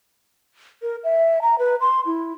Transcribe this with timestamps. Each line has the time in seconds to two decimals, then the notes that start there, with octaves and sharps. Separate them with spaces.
0.82 A#4
1.04 E5
1.42 A#5
1.59 B4
1.81 C6
2.06 E4